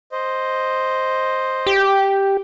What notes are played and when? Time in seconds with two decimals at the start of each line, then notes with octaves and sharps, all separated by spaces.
0.12 C5 D#5
1.67 G4